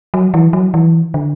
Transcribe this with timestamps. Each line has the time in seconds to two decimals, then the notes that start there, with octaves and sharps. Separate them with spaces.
0.14 F#3
0.34 E3
0.53 F#3
0.74 E3
1.14 D3